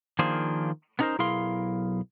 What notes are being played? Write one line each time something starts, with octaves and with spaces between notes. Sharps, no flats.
D#3 F3 A#3 D4 G#4 C5
B3 C#4 D#4 A4 A#4 C5
B1 E4 G#4 A#4 F5 C6